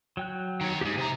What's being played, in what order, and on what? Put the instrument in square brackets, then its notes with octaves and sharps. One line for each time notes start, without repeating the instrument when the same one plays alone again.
[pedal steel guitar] F#3 G5 F#6
[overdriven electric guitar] D#3 C#5
[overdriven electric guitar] D#2 G#2 [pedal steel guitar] G4 G#4
[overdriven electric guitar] C3 A#5